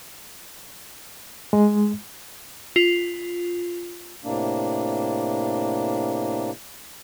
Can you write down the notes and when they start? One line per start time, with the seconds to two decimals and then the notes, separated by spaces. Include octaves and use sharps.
1.53 G#3
2.76 F4
4.24 A2 C3 A#3 D4